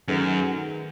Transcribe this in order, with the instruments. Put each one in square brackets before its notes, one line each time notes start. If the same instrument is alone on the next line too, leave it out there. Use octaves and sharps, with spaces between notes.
[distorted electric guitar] F#2 [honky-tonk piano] D#3 A3 D#4 G#4 B4